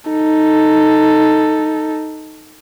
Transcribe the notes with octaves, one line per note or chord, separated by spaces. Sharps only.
D#4 A4